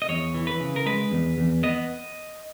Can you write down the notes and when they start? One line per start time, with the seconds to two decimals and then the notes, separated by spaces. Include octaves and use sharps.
0.02 D#5
0.09 E2 C#5
0.34 E3
0.47 B4
0.60 C#3
0.76 A#4
0.86 G#3 B4
1.11 E2
1.38 E2
1.63 B3 D#5